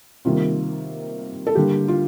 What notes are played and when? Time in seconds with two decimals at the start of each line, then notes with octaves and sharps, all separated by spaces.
0.25 C3 D#3 G3 A#3 F4
1.47 A4
1.55 D3 G3 A#3 G4
1.88 F4